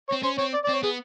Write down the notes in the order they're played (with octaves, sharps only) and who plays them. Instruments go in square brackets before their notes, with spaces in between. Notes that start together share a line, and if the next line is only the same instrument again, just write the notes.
[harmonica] C#5
[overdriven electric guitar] C4
[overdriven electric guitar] C#4 [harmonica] C5
[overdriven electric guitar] C4 [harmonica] C#5
[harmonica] D5
D5
[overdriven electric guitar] C4 [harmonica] C#5
[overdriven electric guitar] B3 [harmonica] G#4